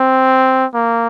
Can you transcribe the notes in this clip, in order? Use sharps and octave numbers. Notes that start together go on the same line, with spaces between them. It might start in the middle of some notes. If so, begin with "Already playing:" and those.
Already playing: C4
A#3